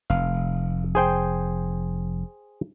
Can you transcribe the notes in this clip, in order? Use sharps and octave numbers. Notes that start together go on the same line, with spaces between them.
F1 F5
G#4 C5 G5